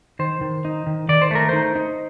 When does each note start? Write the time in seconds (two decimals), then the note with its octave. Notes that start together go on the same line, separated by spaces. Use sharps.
0.19 D#3 C5
0.41 D#3
0.65 D#4
0.87 D#3
1.09 D#3 D5
1.22 C5
1.31 A3 A#4
1.49 D#4 C5
1.76 D#4